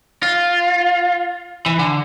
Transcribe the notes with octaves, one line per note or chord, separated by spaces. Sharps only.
F4
E3
D3